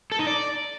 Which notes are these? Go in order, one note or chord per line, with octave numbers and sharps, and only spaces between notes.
A4
D#4
D5